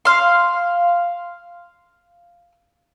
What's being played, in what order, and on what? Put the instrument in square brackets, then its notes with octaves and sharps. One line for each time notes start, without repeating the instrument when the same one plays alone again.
[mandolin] F5 C6